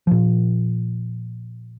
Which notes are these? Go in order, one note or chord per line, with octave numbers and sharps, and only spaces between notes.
A#2 F3